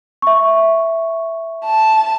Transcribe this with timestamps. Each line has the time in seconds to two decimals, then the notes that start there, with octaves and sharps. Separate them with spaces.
0.22 E5 C#6
1.65 A5